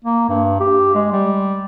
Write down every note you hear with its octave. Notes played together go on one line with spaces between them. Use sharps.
A#3
G2
G4
G#3
G3